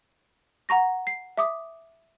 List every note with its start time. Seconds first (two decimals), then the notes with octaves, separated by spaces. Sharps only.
0.69 F#5 A#5 C#6 A#6
1.07 C7
1.37 E5 D6 D#6